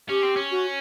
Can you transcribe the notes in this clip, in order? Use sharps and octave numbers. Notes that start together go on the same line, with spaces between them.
C#4 G4
C4
C#4
F#4